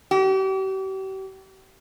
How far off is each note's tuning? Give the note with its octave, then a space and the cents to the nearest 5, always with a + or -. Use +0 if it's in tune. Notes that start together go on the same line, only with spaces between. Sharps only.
G4 -40